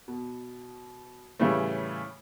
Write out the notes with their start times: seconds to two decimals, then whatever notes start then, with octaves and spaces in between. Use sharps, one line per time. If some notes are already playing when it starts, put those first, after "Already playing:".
0.08 B2
1.39 A2 C#3 E3 G3 A3